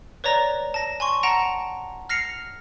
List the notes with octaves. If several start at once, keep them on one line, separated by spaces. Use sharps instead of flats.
B4 C#5 D5 A#5 A#6
A5 A#6
G#5 C6 C#6
F#5 A5 A#5 A#6 D7 F7
F6 A#6 C7 C#7 F7